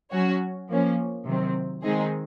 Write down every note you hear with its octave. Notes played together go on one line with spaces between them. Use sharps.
F#3 C#4 F#4 C#5
F3 A#3 C#4
C3 D#3 F#3 C4
D#3 G#3 C4 D#4 G#4